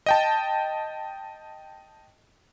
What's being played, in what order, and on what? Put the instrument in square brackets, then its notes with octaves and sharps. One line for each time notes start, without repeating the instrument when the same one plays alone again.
[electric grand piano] D#5 G5 A5